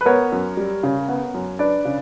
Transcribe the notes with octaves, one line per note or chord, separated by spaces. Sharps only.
B4
B3 A#4 C#5
F#2
G3
C#3
B3
F#2
D4 B4 D5
C#3